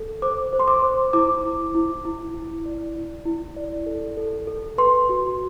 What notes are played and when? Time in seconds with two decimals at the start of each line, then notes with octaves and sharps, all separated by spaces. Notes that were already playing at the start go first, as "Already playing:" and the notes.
Already playing: A4
0.22 C5 D6
0.53 C5
0.60 C6
0.68 D6
0.82 C5
1.13 E4 D6
1.44 E4
1.75 E4
2.05 E4
2.34 E4
2.66 D5
2.96 E4
3.26 E4
3.57 D5
3.86 A4
4.17 A4
4.47 A4
4.78 B4 C6
5.09 F#4